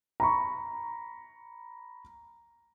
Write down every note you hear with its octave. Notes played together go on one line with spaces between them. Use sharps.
A#5 B5 C#6